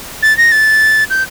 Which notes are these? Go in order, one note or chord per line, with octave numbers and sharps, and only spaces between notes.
A6
A#6
A6
G6